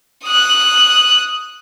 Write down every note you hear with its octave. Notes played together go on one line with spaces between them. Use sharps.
D#6 F#6